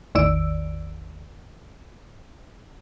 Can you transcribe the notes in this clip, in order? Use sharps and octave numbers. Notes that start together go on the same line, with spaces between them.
A1 E2 D#3 D5 E6 D7